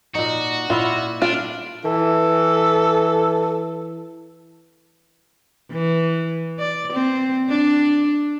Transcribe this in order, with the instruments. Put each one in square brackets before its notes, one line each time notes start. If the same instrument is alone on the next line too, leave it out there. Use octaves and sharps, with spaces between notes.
[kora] A#2 D#4 [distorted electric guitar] F#4
[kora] A#2 E4 E5 [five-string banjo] F4
[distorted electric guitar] D4 [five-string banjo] F4
[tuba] E3 [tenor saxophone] A4
[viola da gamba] E3
D5
C4
D4